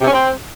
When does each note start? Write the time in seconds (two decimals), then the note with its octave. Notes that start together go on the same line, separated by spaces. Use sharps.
0.01 C3
0.07 C#4
0.13 C4